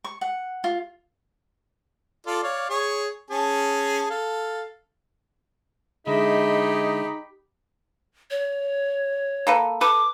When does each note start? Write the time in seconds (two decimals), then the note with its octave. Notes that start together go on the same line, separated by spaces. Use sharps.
0.04 C#6
0.21 F#5
0.64 F4
2.27 F4 A4 D5
2.43 C#5 D5 F5
2.70 G#4 C#5 C#6
3.30 C#4 G#4 A5
4.10 A4 F5
6.07 D3 G#3 D#4 E4 G4 G#4 D#5 B5
8.30 C#5
9.47 A#3 A4 B4
9.81 A4 B4 D6